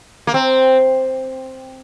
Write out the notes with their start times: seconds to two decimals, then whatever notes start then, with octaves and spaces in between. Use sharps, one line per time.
0.27 A#3
0.34 C4